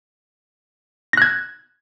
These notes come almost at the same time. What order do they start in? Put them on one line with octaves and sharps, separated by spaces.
A#6 F#6 G#6